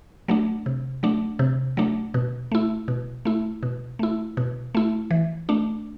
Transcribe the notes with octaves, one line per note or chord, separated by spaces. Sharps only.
F#3 A3 D4
C3
F#3 A3 D4
C3
F#3 A3 D4
B2
A3 E4
B2
A3 E4
B2
A3 E4
B2
A3 E4
E3
A3 D4